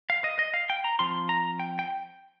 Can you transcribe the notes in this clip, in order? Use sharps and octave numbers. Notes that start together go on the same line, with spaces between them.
F5
D#5
D#5
F5
G5
A#5
F3 C4 F4 C6
A#5
G5
G5